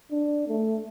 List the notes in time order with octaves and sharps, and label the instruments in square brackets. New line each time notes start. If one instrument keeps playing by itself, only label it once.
[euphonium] D4
A3